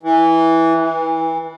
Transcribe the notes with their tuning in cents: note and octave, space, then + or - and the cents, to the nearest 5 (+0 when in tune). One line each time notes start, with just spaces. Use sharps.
E3 -5
E3 -25